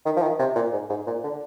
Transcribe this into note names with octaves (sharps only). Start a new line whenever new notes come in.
D#3
F3
D#3
C3
A#2
G#2
G#2
A#2
D3